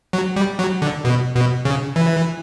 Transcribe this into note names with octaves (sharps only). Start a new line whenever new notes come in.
F#3
G3
F#3
D3
B2
B2
C#3
E3